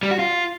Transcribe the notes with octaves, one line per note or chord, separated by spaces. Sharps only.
G3
F#4
F4